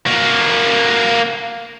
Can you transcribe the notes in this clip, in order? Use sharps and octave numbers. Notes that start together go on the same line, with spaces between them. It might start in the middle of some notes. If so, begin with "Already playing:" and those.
A#3 F#4